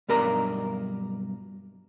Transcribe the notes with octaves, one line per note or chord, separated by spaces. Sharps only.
B1 G2 A#4 D5 A#5